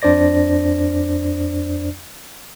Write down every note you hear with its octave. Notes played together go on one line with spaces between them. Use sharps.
F2 D4 C5 D5 A#6